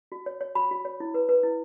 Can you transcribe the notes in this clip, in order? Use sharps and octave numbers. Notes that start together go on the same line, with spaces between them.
F#4
C#5
C#5
F#4 B5
F#4
C#5
E4
B4
B4
E4